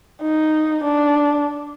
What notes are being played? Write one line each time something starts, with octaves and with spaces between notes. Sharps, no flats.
D#4
D4